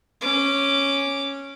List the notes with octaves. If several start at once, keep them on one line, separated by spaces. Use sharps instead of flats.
C#4 D6